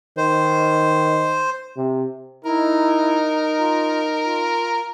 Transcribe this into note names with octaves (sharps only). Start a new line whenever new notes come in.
D#3 C5
C3
D#4 E4 A#4
F4
F4